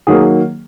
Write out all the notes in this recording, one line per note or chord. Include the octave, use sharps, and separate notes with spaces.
D#3 F#3 A#3 G#4